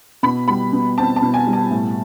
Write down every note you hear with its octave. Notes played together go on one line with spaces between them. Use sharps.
B2 B5
G3 B5
B2
C4 A5
A5
B2
G#5
G3
A5
A2